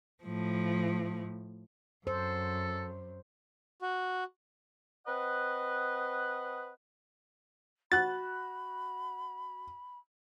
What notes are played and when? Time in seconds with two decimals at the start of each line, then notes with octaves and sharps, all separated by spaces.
0.24 A2 F3
2.07 F#2 A4 C5
3.82 F#4
5.07 C4 B4 D#5 F#5
7.92 F#4 B5 F#6 A6